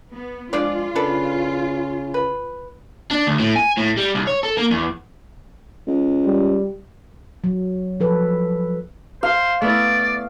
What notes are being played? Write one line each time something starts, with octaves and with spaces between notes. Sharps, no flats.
B3
F3 G#3 D4 F4 D5
C#3 D4 A4 B4
B4
D4
D2
A2
G#5
A2
G3
C2
C#5
A4
A#3
E2
C#2
G3
F#3
F3 A4 B4
C5 F5
A3 B3 E4 D5